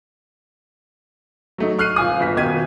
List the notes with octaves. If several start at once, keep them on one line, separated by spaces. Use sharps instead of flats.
F#3 A3 D#4
C#6 F6 F#6 C7 D#7
D#1 F4 G#5 D#6
G1 B6
D#1 B2 D#3 G#6 D#7